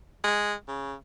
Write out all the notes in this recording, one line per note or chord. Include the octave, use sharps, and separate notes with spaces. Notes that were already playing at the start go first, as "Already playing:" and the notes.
G#3
C#3